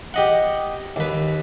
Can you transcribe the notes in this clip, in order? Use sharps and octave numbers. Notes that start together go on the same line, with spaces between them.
G4 D#5 F#5
D#2 B4